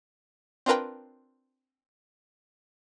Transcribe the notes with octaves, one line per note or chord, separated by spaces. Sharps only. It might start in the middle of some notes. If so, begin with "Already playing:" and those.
C4 D4 F4 A#4 B4 G5